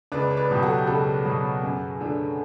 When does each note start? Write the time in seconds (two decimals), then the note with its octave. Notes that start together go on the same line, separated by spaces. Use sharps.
0.12 C#2 B4 D5
0.30 C#5
0.37 B4 D5
0.50 B2 F#3 G4
0.62 F#4 A4
0.76 G4
0.87 C#2 F#4 A4
1.25 B2 F#3
1.63 F#2
2.01 D3 A3